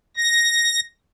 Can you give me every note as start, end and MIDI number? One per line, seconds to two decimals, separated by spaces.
0.17 0.80 94